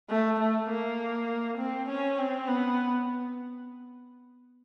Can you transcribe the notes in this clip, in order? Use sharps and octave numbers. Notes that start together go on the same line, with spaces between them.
A3
A3
A#3
C4
C#4
C4
B3